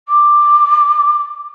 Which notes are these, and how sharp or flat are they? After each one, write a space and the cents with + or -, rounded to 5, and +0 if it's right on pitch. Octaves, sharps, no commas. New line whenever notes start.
D6 +10